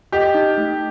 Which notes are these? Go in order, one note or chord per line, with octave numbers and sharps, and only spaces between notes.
G4 D#5
D#4
A3